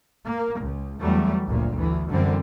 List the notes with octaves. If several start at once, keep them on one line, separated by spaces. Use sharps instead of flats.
A#3
C#2
E2 F#3 G3 A3
G1 D2 A#2
D2 E3
F#2 D3 E3 G3 C4